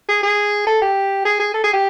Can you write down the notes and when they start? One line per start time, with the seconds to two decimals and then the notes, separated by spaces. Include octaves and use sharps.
0.09 G#4
0.23 G#4
0.67 A4
0.82 G4
1.25 G#4
1.40 G#4
1.54 A4
1.64 G#4
1.73 G4